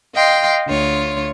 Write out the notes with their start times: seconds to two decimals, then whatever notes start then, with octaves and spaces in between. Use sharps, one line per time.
0.14 D#5 F5 G5 C6
0.67 D2 F4 C#5